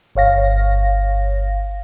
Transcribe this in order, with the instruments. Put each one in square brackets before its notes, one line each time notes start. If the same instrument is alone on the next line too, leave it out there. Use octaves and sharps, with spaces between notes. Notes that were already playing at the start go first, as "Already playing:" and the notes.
[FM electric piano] G1 C#5 F5 A#6